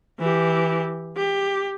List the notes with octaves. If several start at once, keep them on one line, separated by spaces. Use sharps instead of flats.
E3 G4
G4